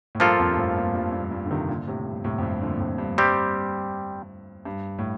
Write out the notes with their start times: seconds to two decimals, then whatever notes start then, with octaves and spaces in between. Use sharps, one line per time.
0.15 A2
0.20 G2 F3 A#3 F4 A4
0.39 F2
0.51 G2
0.57 F2 A2
0.76 G2 A#2
0.95 G2 A#2
1.13 G2 A#2
1.31 G2 A#2
1.46 D3
1.51 C3 D#3
1.68 A#2 D3
1.87 A2 C3
2.06 G2
2.24 A2 C3
2.38 F2
2.43 G2
2.62 A#2 D3
2.80 F2 A2
2.98 G2
3.18 G3 C4 G4
4.65 G2
4.98 A2